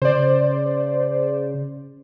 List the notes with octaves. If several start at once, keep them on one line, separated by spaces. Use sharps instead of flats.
C#3 C5 D5